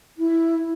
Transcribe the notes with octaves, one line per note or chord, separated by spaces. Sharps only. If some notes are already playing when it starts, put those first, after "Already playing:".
E4